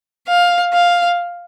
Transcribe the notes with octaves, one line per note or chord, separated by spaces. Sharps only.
F5
F5